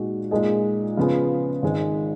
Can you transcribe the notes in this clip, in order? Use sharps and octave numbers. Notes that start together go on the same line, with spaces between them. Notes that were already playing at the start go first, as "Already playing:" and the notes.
Already playing: A#2 G#3 D#4 F#4
A#2 G#3 D#4 G#4 D#5
C#3 F3 B3 F4 G#4
G#1 G#2 D#3 G#3